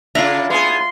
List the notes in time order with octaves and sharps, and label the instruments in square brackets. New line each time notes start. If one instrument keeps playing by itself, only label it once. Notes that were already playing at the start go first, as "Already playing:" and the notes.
[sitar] C#3 D4 [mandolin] E4 [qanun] F4 F#5 A#5
[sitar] B3 G#4 [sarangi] C6